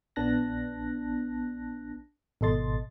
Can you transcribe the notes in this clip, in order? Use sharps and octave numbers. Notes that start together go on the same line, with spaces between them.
A#1 B3 D4 A5 F#6 A#6
G#1 B2 A4 D#5 C6 A6